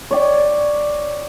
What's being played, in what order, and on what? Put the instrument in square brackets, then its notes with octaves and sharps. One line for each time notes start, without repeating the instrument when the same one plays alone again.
[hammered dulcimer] C#5 D5 G5